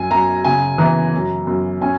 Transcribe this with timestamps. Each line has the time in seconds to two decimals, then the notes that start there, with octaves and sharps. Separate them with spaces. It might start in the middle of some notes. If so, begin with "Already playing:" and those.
Already playing: F#2 G#5
0.10 F#2 A#5
0.44 C#3 G#5
0.78 E3 A#5
1.13 F#2
1.47 F#2
1.82 C#4 G#5